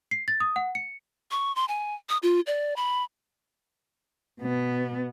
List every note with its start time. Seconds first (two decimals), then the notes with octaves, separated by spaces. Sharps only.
0.11 C7
0.28 A6
0.40 D#6
0.56 F#5
0.75 C#7
1.31 C#6
1.56 C6
1.68 G#5
2.09 D#6
2.23 F4
2.47 D5
2.76 B5
4.41 B2 B3